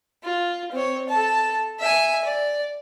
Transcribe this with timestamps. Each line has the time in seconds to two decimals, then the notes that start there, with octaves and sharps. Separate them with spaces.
0.23 F4
0.72 C4 C#5
1.09 A4 A5
1.79 E5 G#5
2.24 D5